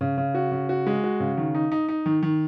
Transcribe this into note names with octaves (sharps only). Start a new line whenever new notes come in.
C#3
C#3
F#4
C#3
F#4
G#3
F#4
C#3
D#3
D#4
D#4
D#4
D#3
D#3